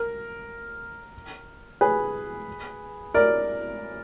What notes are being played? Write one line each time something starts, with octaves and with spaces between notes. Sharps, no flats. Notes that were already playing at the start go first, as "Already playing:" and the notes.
Already playing: A#4
G#4 B4
A#4 D5